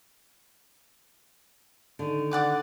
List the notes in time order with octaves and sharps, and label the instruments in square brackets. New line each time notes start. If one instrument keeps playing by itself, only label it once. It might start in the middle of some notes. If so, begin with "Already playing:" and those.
[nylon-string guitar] D3 D#3
[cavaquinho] D5 F#5 D6